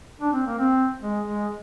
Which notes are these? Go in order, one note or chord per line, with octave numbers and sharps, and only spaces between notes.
D4
C4
A#3
C4
G#3
G#3